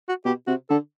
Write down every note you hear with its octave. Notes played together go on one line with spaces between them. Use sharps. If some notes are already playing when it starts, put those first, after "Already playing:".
F#4
B2 G4
C3 F#4
D3 A4